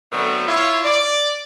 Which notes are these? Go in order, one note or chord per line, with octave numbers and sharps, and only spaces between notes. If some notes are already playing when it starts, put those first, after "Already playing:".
B2 D3 F#3 A3 B3 C4
E4 F4 C#5
D5